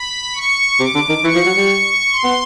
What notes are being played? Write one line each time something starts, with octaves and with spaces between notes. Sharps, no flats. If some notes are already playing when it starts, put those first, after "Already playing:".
Already playing: B5
C#6
C3 D6
D3
D#3
E3 C#6
F3
F#3
G3
C6
B3